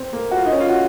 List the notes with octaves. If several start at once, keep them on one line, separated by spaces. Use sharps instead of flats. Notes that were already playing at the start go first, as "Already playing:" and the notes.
Already playing: C4
A#3
F#4
F4
D#4
C#4
F4
F#4